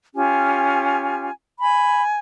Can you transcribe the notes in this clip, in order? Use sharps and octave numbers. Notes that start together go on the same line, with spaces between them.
C#4 F4 G4 G#5
G#5 B5